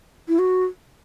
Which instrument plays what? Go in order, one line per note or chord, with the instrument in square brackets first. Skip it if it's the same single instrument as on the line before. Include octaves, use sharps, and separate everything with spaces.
[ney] E4
F#4